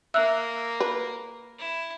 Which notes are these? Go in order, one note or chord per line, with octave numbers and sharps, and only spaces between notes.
A#3 E5 E6 F#6
B4
E4